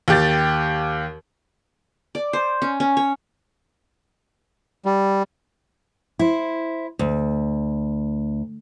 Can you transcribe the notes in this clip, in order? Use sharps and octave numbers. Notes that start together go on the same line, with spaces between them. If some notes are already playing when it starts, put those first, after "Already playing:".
D#2 G4 A6
D5
C5
C#4
C#4
C#5
G3
E4 C5
D2